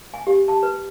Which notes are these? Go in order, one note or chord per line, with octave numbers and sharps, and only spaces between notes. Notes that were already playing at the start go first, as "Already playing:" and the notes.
G#5
G4
A5
B4